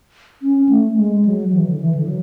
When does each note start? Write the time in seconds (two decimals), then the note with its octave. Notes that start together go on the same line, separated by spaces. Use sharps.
0.42 C#4
0.69 A3
0.97 G#3
1.25 F#3
1.52 E3
1.67 D3
1.81 E3
1.95 D3
2.07 F#3